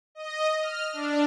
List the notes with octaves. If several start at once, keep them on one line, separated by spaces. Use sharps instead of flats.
D#5
F6
D4